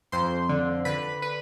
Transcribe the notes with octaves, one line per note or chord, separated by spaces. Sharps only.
F2 C5 C6
D3
D3 B4 B5
B4 B5